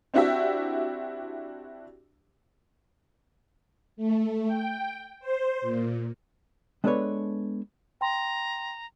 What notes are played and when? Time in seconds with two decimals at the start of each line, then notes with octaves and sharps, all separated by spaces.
0.14 C4 D4 E4 F#4 G4 E5
3.97 A3
4.46 G5
5.20 C5
5.62 A#2
6.84 G#3 B3 D4 A4 B4 C#5
8.01 G5 A#5 C6